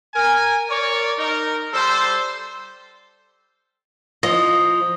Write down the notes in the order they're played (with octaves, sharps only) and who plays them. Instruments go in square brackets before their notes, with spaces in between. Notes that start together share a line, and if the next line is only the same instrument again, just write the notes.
[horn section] A#4 G#5
A#4 C#5 D5
D#4 A#4
G3 A4 C5
[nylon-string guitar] F3 [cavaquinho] D#5